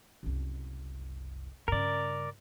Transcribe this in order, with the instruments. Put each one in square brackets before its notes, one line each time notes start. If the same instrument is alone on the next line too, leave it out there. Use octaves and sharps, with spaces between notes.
[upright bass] F#1 C2
[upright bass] G2 C#3 [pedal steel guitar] A#4 D5